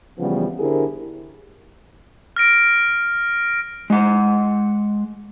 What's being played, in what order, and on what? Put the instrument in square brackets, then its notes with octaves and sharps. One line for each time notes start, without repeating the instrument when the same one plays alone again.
[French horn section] C#3 E3 F3 G3 B3
D3 E4 G4 G#4 A#4 C5
[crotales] F6 A#6 D7
[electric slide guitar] G#3 F#5